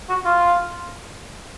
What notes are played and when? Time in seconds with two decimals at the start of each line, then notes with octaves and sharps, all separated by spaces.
0.09 F#4
0.25 F4